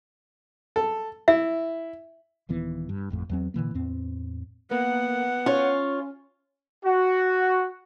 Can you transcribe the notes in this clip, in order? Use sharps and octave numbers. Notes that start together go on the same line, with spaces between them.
A4
E4 E5
D#1 D#2 E3 B3
G2
G#1 F2 A2
E2 F#3 C4
A#2 D3 E3 A#3
E2 A2 C4
A#3 B3 F#5
C#4 F4 C#5
F#4